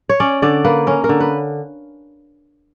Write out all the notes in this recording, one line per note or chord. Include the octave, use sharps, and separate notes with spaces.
C#5
C#4 D5
D3 D5
A#3 B4
C#4 A#4
A#4
D3
B4